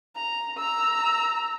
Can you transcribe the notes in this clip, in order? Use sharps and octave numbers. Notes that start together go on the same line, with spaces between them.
A#5
A#5 E6